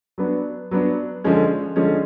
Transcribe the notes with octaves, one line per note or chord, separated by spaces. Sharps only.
F#3 B3 D4
F#3 B3 D4
D3 F3 G#3 C#4
D3 F3 G#3 C#4